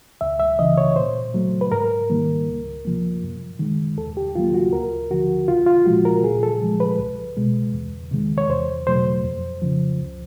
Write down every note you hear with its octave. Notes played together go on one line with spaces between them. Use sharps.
C#2 E5
E5
C#3 E3 D#5
C#5
A#2 C5
F#3 A3
B4
G#2 A#4
D#3 G3 A#3
C#2
C3 F3 A#3
F#2
D#3 G#3
D#2 A4
G4
D#3 F#3 A#3 F4
F#4
D2 A#4
D3 F3 F#4
C2 F4
F4
A#2 F3 G#3 F#4
A#4
A#2 G#4
A4
F3 G#3
B4
C2
B2 G#3
E2
C3 D#3 G#3
C#5
E2 C5
B2 F#3 A3 C5
F2
C#3 F3
C#2